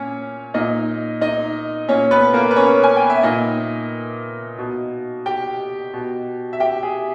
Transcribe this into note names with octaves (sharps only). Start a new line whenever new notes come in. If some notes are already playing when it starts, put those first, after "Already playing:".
Already playing: A#2 C#4 C#5
A#2 D#4 D#5
D#4 D#5
A#2 C#4 C#5
B3 B4
A#3 A#4
B4
C#4 C#5
G#5
G5
E5
A#2 D#4 D#5
B2
G4 G5
B2
E5
G4 G5
G#4